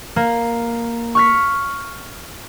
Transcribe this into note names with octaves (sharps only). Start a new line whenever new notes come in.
A#3
C#6 F6 B6